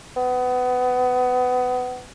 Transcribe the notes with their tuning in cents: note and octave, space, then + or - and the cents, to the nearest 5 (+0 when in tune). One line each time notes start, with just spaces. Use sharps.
B3 +25